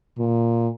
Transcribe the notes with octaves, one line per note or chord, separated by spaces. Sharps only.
A#2